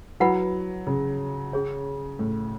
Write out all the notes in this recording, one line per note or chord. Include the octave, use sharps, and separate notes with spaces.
F#3 E4 B4 F#5 B5
C#3
C#4 G#4 C#5
A2